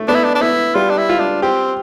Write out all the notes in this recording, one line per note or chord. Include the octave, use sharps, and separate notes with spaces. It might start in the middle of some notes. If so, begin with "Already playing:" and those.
Already playing: A3
B3 D4
E4
D4
D4
B3 E4
G3 F4
D4
E4
F4
D4
C4 G4